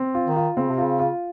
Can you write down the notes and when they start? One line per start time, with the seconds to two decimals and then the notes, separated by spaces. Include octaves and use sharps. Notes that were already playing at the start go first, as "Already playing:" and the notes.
Already playing: C4
0.15 F4
0.26 D#3
0.36 F4
0.57 C#3 C4
0.70 C3
0.78 C#3 F4
0.99 F4